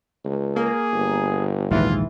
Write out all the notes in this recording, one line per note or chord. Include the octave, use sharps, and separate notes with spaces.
C#2
A#3 G#4
G1
A#1 D#2 G#2 E3 F4